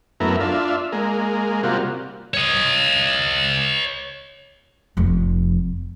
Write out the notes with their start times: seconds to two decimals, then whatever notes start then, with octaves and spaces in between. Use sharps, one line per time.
0.20 F#2 A3 B3 E4 A#4
0.40 D4 F4 E5
0.92 G#3 A#3
1.63 C3 G3 A#3 F4 F#4
2.34 C#5 D#5
4.97 F1 F2